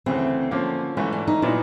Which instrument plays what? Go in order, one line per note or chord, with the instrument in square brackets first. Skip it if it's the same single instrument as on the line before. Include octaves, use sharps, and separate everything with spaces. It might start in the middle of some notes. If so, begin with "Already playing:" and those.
[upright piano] D2 C#3 E3 [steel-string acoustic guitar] C4
[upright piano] D3 F3 A#3 [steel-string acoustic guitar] C#4
[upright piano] G#2 E3 A3 [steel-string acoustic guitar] C#4
[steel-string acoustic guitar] D4
D#4
[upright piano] A#2 F#3 B3 D#4 [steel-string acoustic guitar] E4